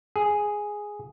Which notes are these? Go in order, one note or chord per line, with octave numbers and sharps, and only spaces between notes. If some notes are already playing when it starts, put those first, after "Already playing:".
G#4